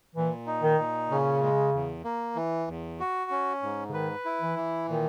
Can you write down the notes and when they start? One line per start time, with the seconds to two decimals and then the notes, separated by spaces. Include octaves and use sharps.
0.16 A#2 E3
0.47 D#4
0.63 D#3
0.78 A#2
1.10 C#3 C#4
1.41 G#3
1.73 E2
2.04 A#3
2.36 E3
2.68 E2
3.00 F#4
3.31 C#4
3.62 G#2
3.89 C#3
3.93 D#3 B4
4.25 E4
4.41 E3
4.56 E3
4.88 A#2 D#3